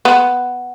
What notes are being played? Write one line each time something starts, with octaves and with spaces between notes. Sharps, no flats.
B3